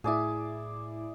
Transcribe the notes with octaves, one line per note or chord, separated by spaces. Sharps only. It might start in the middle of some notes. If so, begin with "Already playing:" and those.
A2 E4 G#4 D5 E5